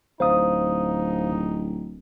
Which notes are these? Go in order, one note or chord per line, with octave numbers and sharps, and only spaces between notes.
D1 D#4 C5 F5 D#6